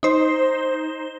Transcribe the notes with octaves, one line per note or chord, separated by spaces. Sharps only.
D#4 C5